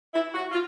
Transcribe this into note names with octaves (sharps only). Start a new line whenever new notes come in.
E4
F#4
F4